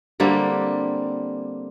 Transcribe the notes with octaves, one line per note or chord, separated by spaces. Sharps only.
D3 G3 A#3 C4